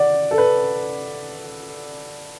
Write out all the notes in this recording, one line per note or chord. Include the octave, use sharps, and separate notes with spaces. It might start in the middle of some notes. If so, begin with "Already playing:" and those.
Already playing: D5 F#5
A4
B4